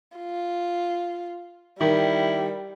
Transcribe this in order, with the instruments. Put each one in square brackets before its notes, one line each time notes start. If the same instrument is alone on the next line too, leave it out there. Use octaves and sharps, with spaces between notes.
[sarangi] F4
[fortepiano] D#3 [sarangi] G3 [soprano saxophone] E4